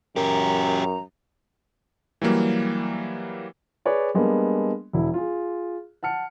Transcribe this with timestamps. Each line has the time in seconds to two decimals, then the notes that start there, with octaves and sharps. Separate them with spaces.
0.16 F#2 C#4 G4 A#4 A#5
2.22 E3 F#3 G3 A#3
3.86 G#4 B4 C#5 D5
4.14 G3 G#3 A#3 B3 D4
4.93 E1 E4
5.14 F4 G#4
6.03 F#5 A5 F6 C#7